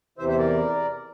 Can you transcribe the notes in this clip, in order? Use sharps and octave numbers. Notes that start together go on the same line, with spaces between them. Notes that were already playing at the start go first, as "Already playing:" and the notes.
E2 C3 E3 C5 E5
C5 E5
A#4 D5